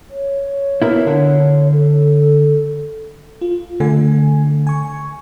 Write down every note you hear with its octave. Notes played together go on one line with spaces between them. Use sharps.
C#5
B2 A#3 E4
D3
A4
F4
D3 A3 G#5
G#5 C#6